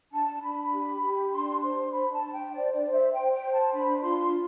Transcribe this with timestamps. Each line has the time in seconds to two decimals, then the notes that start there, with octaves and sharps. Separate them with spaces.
0.11 D4 A5
0.42 D4 B5
0.72 G4
1.02 G4
1.33 D4 C6
1.62 C5 C6
1.92 D4 B5
2.13 A5
2.22 D4
2.33 G5
2.53 C5 D5
2.73 D5
2.82 C5
2.93 E5
3.13 C5 G5
3.33 G5
3.44 C5
3.53 A5
3.73 D4 B5
4.03 F4 C6